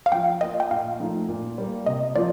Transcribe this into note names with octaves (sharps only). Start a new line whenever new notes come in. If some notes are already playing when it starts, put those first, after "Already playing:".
F5
F3 G5
A#3 F4 D#5
G5
A#2 F5
F3 A3 D#4
A#2
G3 A#3
C3 D#5
F3 A#3 F4 D5